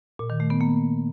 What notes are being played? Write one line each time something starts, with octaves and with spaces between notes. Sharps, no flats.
A#2
D#3
A3
B3
A#3